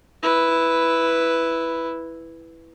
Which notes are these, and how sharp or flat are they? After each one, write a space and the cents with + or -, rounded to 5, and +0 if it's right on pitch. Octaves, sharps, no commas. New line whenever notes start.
E4 +0 B4 +0